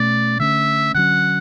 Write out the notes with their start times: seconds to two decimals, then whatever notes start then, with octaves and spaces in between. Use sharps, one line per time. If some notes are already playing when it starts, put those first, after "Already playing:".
Already playing: B2 A3 C#4 D5
0.40 D3 A3 C#4 E5
0.94 D3 F#3 C#4 F#5